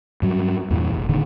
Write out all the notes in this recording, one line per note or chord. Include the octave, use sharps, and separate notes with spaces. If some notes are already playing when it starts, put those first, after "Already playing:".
G2 F#3
E2 G2 A#2 E3
F1 A#1
G1 A#2 D3 D#3